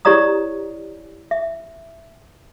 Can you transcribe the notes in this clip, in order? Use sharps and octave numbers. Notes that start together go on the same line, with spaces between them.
E4 G4 C#5 D5 A#5 D#6
E5